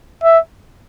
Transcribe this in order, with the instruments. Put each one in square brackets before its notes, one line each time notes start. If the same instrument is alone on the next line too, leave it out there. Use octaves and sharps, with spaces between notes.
[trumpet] E5